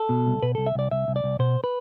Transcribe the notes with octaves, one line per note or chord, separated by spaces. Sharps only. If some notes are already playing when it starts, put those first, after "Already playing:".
Already playing: A4
B2
C2
B2 B4
C2 A4
E5
C2 D5
C2 E5
C2
D5
C2
B2 C5
B4